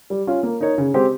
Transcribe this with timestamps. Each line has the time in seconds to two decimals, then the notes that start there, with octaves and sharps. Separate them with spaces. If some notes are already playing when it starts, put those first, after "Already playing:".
0.10 G3
0.27 C#4 F4
0.43 A#3
0.61 D#4 A#4 C#5
0.78 C#3
0.94 G#3 C4 G4 C5